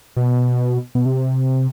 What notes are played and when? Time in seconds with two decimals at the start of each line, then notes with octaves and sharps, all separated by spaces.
0.16 B2
0.95 B2
1.05 C3